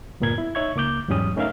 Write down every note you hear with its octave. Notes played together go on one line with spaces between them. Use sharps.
D2 G2 A#2 B3 A#4 G#6
E4
D#4 C#5 E5 C#6 G#6
C#2 A#3 D6 G6
E2 G#2 F#3 G3 C#4 D#6
A3 C#4 D#4 A#4 E5 F5